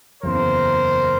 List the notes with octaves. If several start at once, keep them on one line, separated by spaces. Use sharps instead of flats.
F#1 E2 C#3 A#4 C5